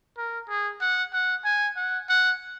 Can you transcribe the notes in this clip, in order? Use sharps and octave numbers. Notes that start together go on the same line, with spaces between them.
A#4
G#4
F#5
F#5
G#5
F#5
F#5